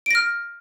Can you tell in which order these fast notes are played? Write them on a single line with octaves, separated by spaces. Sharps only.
D7 A#6 F6